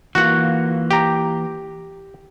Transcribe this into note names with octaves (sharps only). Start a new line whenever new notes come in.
E3 A#3 F4 F#4 F#5
G4 A#5